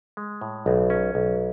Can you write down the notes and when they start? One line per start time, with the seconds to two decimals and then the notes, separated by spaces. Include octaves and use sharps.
0.17 G#3
0.41 A2
0.66 B1
0.90 C#4
1.15 B1